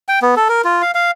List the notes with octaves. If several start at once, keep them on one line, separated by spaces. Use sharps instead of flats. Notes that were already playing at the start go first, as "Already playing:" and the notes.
G5
B3
A4
A#4
F4
F5
F5